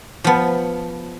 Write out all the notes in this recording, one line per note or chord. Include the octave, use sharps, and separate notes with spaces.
F3 B3